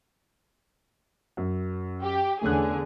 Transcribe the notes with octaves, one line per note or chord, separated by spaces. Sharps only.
F#2
G4
E2 D3 A3 C#4 G#4 F#6